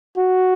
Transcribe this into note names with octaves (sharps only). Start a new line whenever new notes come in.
F#4